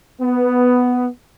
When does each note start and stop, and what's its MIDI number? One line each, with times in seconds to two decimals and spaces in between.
0.20 1.06 59